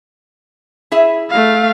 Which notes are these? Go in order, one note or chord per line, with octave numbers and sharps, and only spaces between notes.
E4 G#4 E5
A3 F5